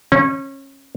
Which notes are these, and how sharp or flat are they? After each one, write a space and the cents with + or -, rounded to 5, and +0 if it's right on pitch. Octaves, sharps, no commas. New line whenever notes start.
C#4 -25